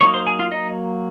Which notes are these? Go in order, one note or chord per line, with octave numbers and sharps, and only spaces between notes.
F#3 A#3 D#4 C#5 C#6
C5 C6
G#4 G#5
F4 F5
D#4 D#5